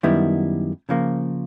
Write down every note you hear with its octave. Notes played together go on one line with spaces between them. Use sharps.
F#2 D#3 G3 B3 E4
C#3 F3 A#3